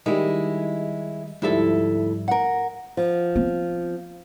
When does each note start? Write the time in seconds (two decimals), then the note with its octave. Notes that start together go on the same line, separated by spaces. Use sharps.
0.06 D#3 G3 G#3 E4
1.42 D2 G#2 F3 G3 E4 A4
2.28 A#4 F#5
2.97 F3
3.36 B3 C4